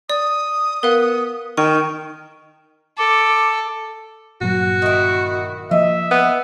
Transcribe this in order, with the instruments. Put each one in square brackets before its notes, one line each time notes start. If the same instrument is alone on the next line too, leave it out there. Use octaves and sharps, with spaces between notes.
[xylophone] D5 [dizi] D#6
[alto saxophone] B3 [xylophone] A#4 F5
[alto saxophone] D#3 [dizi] G5 [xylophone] C#6
[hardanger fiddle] A4 [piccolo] D6
[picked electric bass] G1 A#2 F#3 [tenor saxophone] F#4
[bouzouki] D#3 E4
[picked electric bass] F3 A#3 [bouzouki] D#5 [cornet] E5
[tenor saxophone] B3